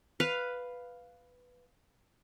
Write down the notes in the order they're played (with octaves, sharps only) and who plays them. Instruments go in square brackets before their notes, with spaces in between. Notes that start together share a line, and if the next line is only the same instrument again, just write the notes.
[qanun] B4 F5